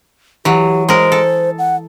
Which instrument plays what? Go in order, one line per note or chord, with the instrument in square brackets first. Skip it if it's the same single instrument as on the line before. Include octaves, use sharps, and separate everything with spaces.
[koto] E3 F#3 [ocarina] G4
[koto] G#3 A#4 [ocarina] C5
[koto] A4
[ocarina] F#5